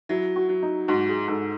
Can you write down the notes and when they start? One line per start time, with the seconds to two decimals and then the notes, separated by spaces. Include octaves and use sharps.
0.09 F#3 E4
0.36 F#4
0.49 F#3
0.63 D#4
0.88 G#2 F#4
1.08 G#4
1.28 G#2 A4